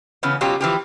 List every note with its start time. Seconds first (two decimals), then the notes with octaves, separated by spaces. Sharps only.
0.23 C#3 E3 B3 C#4
0.41 B2 F#3 C#4 F4 G4
0.61 E3 F3 G4